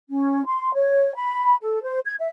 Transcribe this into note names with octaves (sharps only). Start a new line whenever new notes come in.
C#4
C6
C#5
B5
A4
C5
G#6
E5